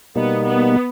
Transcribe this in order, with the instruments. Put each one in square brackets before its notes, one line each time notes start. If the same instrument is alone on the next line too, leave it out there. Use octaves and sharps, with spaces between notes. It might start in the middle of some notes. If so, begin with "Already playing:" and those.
[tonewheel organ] B2 G3 A#3 D#4 [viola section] B3
[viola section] B3